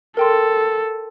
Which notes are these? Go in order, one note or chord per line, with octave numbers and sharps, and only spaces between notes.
A4 A#4 G5 C6